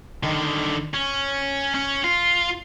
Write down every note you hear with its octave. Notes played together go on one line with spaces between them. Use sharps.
D3 D#3
C#4
C#4
F4